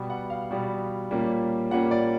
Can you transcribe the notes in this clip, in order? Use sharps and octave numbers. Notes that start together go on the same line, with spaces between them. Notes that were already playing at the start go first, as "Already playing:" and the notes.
Already playing: B2 G3 B3
F#5
F5
B2 G3 B3
A#2 G3 A#3 C#4
A#2 G3 A#3 C#4 F#5
D5